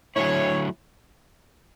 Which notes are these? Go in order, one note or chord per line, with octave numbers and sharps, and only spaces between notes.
D3 F#3 A3 E4 C#5